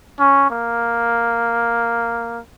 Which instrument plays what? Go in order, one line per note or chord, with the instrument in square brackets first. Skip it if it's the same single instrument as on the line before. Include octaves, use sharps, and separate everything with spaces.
[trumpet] C#4
A#3